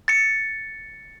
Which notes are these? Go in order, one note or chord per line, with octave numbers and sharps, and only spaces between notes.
A6 C#7